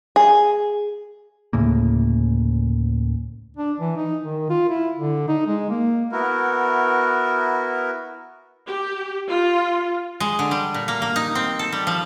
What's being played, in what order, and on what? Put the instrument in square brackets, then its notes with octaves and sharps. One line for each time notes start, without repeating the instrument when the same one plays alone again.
[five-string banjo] G#4
[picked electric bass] D2 A2 C#3 A#3
[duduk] D4
E3
D#4
D#3
F4
E4
D3
D#4
G#3
A#3
[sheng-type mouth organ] B3 E4 F#4 A#4
[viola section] G4
F4
[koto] G#3
D3
G3
A#2
A#3
A#3
D#4
C4
A4
G3
F3